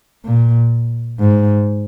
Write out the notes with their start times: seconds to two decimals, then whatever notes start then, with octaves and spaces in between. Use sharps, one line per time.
0.25 A#2
1.19 G#2